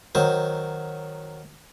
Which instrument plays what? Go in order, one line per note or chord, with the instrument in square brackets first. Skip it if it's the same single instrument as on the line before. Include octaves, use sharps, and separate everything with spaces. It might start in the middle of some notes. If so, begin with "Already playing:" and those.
[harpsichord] D#3 F#3 C5